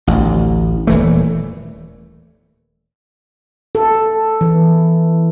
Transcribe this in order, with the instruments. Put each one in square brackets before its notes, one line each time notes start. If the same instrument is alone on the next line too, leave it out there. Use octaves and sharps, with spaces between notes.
[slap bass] A1 D2
D#1 E3 A3
[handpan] A4
E3